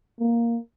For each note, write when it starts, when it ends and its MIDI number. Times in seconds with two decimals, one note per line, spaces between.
0.20 0.58 58